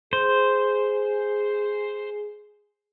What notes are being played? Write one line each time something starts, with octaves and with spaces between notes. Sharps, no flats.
G#4 C5